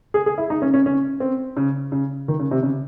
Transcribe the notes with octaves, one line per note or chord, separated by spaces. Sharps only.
G#4
G#4
E4
D#4
C#4
C#4
C#4
C4
C#3
C#3
D#3
C#3
C3
C#3